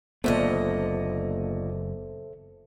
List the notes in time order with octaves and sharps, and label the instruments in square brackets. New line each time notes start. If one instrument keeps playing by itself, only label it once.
[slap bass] F#1 B3 [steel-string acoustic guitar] D2 A#2 D#5 [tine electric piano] A4 C5 E5